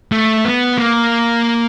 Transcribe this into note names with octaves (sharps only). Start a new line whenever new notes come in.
A3
B3
A#3